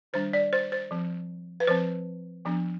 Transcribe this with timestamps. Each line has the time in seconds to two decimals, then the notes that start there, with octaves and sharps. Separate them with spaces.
0.13 D#3 G3 D4 C5
0.33 D5
0.53 C5
0.72 C5
0.91 F3 C4
1.60 B4
1.67 F3 C4 C5
2.45 F3 B3 D4